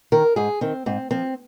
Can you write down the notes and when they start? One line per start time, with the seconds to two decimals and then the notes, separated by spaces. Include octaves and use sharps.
0.12 D#3 A#4
0.36 G#2 G#4
0.61 D#3 C4
0.86 G#2 C4
1.11 F3 C4